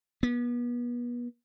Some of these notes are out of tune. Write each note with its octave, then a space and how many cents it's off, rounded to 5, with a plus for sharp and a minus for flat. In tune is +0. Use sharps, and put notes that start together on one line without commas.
B3 -35